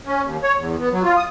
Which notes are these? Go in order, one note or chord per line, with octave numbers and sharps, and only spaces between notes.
C#4
D#2
C#5
E2
B3
F#3
F4
D#6